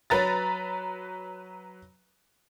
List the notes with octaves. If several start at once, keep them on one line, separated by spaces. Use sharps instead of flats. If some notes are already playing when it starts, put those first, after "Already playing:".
F#3 B4 A#5 A6